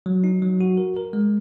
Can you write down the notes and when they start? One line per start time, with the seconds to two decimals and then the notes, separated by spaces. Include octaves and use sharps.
0.06 F#3
0.24 D#4
0.42 F#3
0.61 F#4
0.77 A#4
0.97 A#4
1.13 G#3